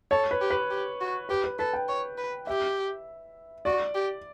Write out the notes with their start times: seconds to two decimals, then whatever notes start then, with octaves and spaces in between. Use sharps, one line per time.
0.11 A4 C#5
0.31 B4
0.41 G4
0.51 B4
0.70 G4
1.00 F#4
1.29 G4 B4
1.44 B4
1.59 A4 B4
1.74 G5
1.88 C#5
2.18 B4
2.47 G4 E5
3.65 F#4 D5
3.94 G4